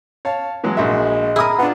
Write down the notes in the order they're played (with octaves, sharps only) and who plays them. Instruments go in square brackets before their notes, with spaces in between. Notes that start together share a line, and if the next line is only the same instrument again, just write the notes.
[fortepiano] C#5 F5 A5
E3 F#3 G#3
[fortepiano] A#1 F#4 E5 [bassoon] G#3
[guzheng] E4 A#4 [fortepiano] G#4 D#6
[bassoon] B3 [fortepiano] D4 F4